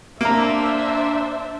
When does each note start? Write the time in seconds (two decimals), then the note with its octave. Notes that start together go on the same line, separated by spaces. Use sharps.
0.21 A#3 D4 C5 E5 A#5